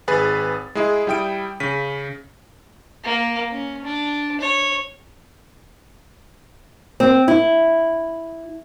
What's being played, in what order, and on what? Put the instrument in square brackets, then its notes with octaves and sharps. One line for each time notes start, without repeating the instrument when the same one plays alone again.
[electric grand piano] G#1 G#4 B4 B5 A6
G#3 E4 G#4
G3 E4 G5 D#6 D7
C#3 B6 D#7
[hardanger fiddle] A#3
C#4
D4
C#5
[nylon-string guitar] C4
E4